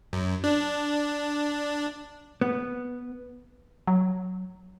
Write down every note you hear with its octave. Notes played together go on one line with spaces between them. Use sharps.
F#2
D4
B3
F#3